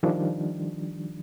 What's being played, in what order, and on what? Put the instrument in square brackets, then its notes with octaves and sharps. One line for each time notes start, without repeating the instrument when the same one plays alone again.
[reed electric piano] D#3 F3 G3 D4